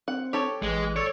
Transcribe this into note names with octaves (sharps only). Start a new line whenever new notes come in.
C4 F#5
G4 A4 C#5
A1 E3 G#3
A4 C#5 D5